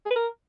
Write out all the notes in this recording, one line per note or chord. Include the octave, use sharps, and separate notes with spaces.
G#4
B4
A#4